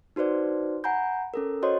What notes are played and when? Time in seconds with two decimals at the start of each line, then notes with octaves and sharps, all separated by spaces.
0.16 D#4 F#4 B4 C5 D5
0.84 F#5 G#5 A#5 B5 G6
1.34 C#4 A4 A#4
1.63 F#4 C5 C#5 D#5 C6